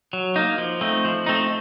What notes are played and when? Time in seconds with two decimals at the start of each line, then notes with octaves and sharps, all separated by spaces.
0.13 F#3
0.36 A#3 D#4
0.58 F3
0.81 A3 C4 D#4
1.05 F3
1.26 A3 C4 D#4